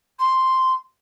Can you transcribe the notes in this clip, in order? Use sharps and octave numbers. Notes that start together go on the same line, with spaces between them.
C6